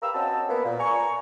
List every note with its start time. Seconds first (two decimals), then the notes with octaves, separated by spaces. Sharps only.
0.02 G4 A#4 B4 F5 E6
0.14 C4 C#4 F#4 D#5 A5
0.48 A#3 B3
0.65 A#2
0.79 G#5 A#5 C#6